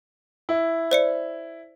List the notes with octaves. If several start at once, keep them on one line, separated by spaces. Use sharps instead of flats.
E4
C5 D5 C#7